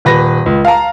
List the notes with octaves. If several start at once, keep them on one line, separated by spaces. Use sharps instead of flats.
D#1 B4 A#6
C#2
F5 A5 A#5